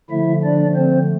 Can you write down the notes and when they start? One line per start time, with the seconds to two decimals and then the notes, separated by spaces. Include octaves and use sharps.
0.10 D3 F3 A3 E4 E5
0.43 D4 D5
0.76 C4 C5